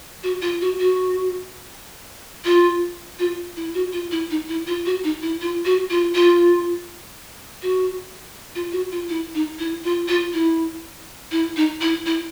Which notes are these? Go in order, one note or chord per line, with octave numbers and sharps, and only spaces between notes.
F#4
F4
F#4
F#4
F4
F4
E4
F#4
F4
E4
D#4
E4
F4
F#4
D#4
E4
F4
F#4
F4
F4
F#4
F4
F#4
F4
E4
D#4
E4
F4
F4
E4
E4
D#4
E4
E4